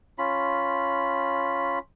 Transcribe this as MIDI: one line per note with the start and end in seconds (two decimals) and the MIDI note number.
0.18 1.79 61
0.18 1.79 65
0.18 1.79 83